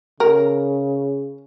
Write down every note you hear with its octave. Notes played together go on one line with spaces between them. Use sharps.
C#3 A#4